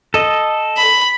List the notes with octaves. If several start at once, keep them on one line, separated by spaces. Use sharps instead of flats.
A4 D#5
B5